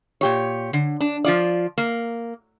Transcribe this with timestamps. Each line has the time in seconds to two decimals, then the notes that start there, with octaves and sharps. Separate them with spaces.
0.21 A#2 G4 C#5
0.73 D3
1.00 D4
1.24 F3 F4 D5
1.78 A#3